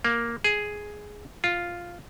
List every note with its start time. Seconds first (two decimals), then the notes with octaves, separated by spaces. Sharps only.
0.04 A#3
0.44 G#4
1.44 F4